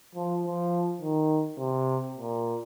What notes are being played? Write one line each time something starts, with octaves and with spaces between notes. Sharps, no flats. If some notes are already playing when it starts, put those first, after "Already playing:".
F3
F3
D#3
C3
A#2